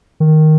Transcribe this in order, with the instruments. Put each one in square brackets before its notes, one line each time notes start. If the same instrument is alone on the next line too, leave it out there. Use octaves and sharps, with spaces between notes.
[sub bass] D#3